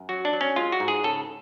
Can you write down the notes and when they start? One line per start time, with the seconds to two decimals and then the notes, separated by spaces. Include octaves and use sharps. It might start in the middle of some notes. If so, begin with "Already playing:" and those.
Already playing: F#2
0.09 F#3 F#4
0.25 D4
0.33 F#3
0.41 C#4
0.56 G#3 F4
0.72 F#4
0.80 G#2
0.88 G#4
1.04 C#3 A4